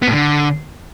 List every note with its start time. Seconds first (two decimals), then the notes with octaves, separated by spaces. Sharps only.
0.02 B3
0.08 A2
0.13 D3